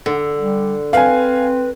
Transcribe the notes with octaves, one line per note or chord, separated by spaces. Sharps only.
D3
G3
C4 B4 F5 G#5